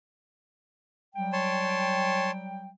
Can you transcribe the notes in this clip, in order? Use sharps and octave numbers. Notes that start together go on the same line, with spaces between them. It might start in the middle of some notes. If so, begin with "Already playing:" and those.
F#3 G3 G5
C#5 A5 C6